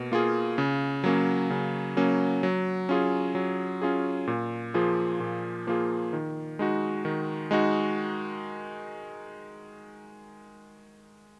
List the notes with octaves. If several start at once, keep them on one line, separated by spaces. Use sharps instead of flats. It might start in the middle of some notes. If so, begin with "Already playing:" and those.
Already playing: B2 A#3
A#3 F4 G#4
C#3
F#3 A#3 C#4
C#3
F#3 A#3 C#4
F#3
C#4 F4 G#4
F#3
C#4 F4 G#4
A#2
F3 A#3 F4 G#4
A#2
F3 A#3 F4 G#4
D#3
G#3 D#4 F#4
D#3
G#3 D#4 F#4